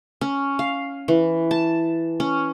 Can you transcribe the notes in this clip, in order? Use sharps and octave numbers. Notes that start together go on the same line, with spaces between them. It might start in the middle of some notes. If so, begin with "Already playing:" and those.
C#4
F5
E3
A5
C#4